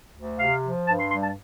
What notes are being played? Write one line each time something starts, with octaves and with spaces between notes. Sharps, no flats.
D2
C3 F5
F3
G2 A5
C6
G3 C6
A5